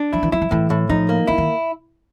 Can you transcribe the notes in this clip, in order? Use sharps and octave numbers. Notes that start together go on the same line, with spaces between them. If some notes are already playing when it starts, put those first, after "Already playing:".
Already playing: D4
F3 E4
E3
F#3 E4
F3
A2 E3
A2
F3 D#4
A#3
E3 E4
D#3